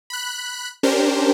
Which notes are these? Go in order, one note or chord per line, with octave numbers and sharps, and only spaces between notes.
B5 F#6
C#4 D4 G4 A#4 C5